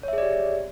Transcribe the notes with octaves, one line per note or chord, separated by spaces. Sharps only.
G4 G#4 C#5 D5 E5